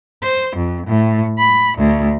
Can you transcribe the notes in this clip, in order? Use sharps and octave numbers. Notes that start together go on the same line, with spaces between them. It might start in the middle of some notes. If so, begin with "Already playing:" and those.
C5
F2
A2
B5
D2